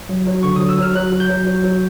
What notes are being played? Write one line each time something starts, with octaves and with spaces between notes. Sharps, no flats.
F#3
F#3
D3 C#6
F#3 D#6
E6
F#3 F6
F#3 F#6
F#3
G6
F#3
F#3
F#3